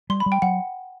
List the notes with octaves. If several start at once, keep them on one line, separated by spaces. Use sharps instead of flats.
G3 C6
B5
G3
G5
F#3 F#5